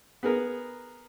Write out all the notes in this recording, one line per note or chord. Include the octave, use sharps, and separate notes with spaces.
B3 G#4 A#4 B4